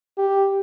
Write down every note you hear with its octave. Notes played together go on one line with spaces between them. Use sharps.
G4